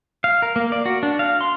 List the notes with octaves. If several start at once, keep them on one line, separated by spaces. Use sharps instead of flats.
F5
A#4
A#3
D5
F#4
D4
F5
C6